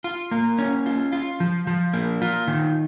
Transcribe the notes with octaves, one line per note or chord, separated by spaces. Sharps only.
F4
A#3
C#4
F4
F4
F3
F3
A#3
F4
D#3